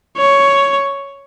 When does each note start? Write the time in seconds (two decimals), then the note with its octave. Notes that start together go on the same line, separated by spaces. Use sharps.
0.17 C#5